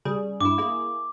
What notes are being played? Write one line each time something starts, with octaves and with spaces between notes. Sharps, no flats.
C#3 G3 G#4
G2 E4 D6
A#3 E4 G#4